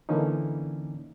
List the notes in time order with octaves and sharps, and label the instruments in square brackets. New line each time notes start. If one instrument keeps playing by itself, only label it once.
[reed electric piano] D3 E3 A#3 C#4 D#4